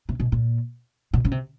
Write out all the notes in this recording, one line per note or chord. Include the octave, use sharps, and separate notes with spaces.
C3
B2
A#2
B2
C#3
C3